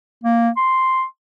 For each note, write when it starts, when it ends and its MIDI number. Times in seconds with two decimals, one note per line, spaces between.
0.24 0.49 58
0.57 1.04 84